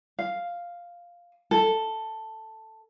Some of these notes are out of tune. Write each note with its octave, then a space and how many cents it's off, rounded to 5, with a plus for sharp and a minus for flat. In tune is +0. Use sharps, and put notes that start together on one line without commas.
F5 +0
A4 +5